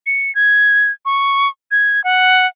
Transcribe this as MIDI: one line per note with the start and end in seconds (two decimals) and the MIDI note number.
0.06 0.34 97
0.35 0.91 92
1.05 1.48 85
1.71 2.03 92
2.04 2.46 78